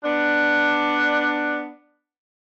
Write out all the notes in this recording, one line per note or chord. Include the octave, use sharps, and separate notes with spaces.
B3 D4